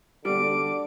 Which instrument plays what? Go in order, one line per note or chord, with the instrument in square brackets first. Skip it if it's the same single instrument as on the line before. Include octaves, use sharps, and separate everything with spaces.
[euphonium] D3 [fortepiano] G3 [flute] D6 [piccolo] D7